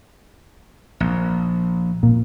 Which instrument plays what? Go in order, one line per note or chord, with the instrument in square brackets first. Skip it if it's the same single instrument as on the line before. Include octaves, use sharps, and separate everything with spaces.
[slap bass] A#1
[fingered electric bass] A#2